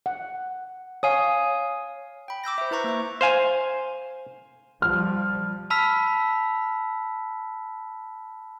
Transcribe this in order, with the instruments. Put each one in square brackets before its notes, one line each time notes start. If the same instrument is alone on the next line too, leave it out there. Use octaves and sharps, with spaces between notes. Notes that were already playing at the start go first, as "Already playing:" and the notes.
[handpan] F#5
[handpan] C#5 [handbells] F5 G#5 D#6
[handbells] G5 B5
D6 E6 G6 A#6
C5 E5
E4 B4 A#5 C#6 A#6
A#3 E5
[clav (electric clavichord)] C5 F5 G#5
[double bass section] F3 G3 [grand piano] F6
[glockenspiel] A5 B5 E6 F6 B6